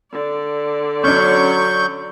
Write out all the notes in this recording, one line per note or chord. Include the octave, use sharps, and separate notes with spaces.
D3 D5
F#3 C#4 D4 C#6 G6